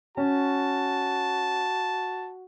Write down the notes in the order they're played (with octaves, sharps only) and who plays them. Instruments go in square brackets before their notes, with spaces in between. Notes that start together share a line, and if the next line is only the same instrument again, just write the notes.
[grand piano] C#4 [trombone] F#4 [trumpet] A5